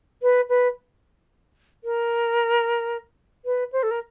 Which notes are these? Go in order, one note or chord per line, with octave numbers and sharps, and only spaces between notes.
B4
B4
A#4
B4
C5
A4
A#4